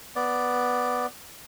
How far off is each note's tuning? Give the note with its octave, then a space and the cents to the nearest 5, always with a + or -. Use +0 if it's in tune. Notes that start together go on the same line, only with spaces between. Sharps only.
B3 +0 D5 +0